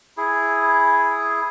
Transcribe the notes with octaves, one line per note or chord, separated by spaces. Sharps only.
E4 G#4